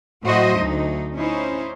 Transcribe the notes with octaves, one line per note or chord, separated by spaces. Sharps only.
A2 F#3 F#4 C5 D#5
D2 D#4
C#4 D#4 E4 C5